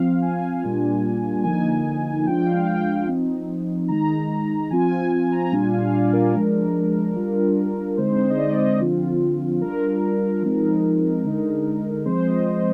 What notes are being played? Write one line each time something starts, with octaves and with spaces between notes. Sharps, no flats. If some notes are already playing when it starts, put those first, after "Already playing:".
Already playing: F3 C4 F4 F5
G#5
A#2 G3 A#3 D4 F4
D3 F3 A#3 D#4 G#5
F3 G#3 D4 F4 G5
F5
G5
F3 C4 D#4
D#3 G#3 D#4 A#5
F3 C4 F4 G#5
G#5
G#5
A#5
A#2 G3 D4 F4 G#5
F5
D5
A#4
F3 G#3 D4
G3 D4 F4
D3 G#3 C4 D#4 C5
C5
D#5
D5
D#5
D3 F3 C4 F4
G3 D4 F4 A#4
F3 G#3 C4 D#4 A#4
D3 G#3 D#4
F3 G#3 C4 C5
D#5
D#5